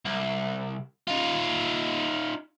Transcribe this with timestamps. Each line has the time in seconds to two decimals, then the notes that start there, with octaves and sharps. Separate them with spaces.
0.05 C2
1.08 D#4 F4